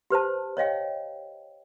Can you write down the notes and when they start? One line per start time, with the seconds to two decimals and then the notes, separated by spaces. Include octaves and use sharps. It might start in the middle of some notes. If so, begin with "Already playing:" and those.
0.10 G4 B4 C5 A5
0.57 C#5 D#5 F5 G5